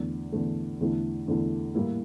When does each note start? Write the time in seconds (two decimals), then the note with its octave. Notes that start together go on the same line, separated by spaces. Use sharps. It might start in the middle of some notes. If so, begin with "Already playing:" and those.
Already playing: E2 D3 A3
0.32 E2 D3 A3
0.80 E2 D3 A3 E4
1.27 E2 D3 A3 E4
1.74 A2 G3 A#3 E4